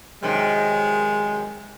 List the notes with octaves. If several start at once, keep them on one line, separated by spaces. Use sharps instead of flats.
F#2 C3 D#3 G#3